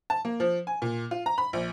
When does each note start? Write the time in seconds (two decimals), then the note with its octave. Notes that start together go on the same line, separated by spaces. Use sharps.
0.10 A5
0.25 A#3
0.40 F3
0.67 G#5
0.82 A#2
1.11 F4
1.26 A#5
1.38 B5
1.53 A#1